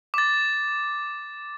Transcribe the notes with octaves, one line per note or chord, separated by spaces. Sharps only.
D6 A6